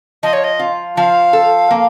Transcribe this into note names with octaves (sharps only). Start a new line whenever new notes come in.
F3 D#5
C#5
D#5
F4
F3 F5
A4
A#3